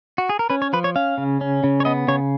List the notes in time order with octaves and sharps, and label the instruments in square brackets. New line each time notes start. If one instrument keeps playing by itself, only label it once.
[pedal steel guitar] F#4
G#4
A#4
C#4 B4
C#5
F3 B4
C#5
C#4 F5
C#3
C#4
C#3
C#5
B3 D#5
C#3 C#5